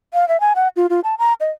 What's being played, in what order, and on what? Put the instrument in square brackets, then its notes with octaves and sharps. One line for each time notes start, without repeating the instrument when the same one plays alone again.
[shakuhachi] F5
E5
G#5
F#5
F4
F4
A5
A#5
D#5